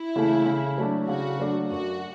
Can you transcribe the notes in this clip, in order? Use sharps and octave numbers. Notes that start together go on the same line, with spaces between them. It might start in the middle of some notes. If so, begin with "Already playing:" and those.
Already playing: E4
C#3 E3 A3
C#3
F#3 A3 D4
C#3 F#4
F#3 A3 D4
F#2 F#4